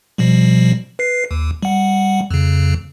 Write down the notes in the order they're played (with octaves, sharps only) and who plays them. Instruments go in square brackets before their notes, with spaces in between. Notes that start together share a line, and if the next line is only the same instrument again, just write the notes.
[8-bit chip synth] B2 F3 G3
B4 C7
D#2
G3 F#5
F2 C#3